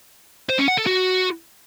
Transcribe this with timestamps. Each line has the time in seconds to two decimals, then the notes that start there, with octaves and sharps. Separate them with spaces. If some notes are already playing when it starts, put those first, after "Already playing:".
0.49 C5
0.59 C#4
0.68 F#5
0.77 A4
0.87 F#4